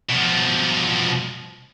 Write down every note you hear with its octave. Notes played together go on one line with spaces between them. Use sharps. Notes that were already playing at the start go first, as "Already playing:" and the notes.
B2 F3